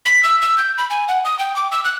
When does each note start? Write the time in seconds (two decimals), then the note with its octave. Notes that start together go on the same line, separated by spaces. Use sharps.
0.05 B6
0.23 E6
0.42 E6
0.58 G6
0.78 B5
0.90 G#5
1.08 F#5
1.25 D#6
1.39 G5
1.56 D6
1.72 E6
1.84 F#6